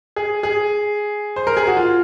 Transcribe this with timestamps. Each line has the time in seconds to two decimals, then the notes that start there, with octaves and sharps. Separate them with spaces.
0.16 G#4
0.43 G#4
1.36 C5
1.47 A#4
1.57 G#4
1.67 F#4
1.77 F4